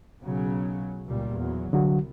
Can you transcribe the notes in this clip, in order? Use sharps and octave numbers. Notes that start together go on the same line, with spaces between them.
B1 C#3 F#3
C#2 A#2 G3
E2 F#3
C2 D3 F#3 F#4